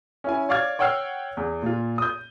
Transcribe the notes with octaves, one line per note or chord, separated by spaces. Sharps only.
C#4 E4 G#5
C#5 D5 F5 D6 F6 G#6
C#5 F#5 G5 E6 F6 C7
E2
A#2 F4
D#6 G6